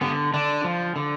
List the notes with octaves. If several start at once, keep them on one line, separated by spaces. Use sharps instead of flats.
D3 B3
D3 D4
F3
D3